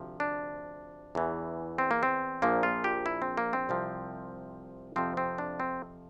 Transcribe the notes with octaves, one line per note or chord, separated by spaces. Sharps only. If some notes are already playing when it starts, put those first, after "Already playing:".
Already playing: D2 C3 F3
D4
E2 E3
C4
A#3
C4
A#1 A#2 F3 A#3
F4
G4
E4
C4
A#3
C4
C2 C3 F3
F2 C3 F3 C4
C4
D4
C4